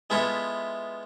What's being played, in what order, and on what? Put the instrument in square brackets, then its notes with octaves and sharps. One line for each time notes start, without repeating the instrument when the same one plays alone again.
[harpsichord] G#3 B3 E4 F4 A4 E5